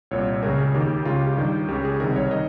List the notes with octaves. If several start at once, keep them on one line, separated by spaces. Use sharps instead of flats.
C2 A#2 C#5
C#2 C#3 A#4
G#4
D#2 D#3 G4
C#2 C#3 F4
G4
G4
G2 D#3
C#2 C#3 G4
G#4
C2 C3 D#3 A#4
C#5
D#3 D#5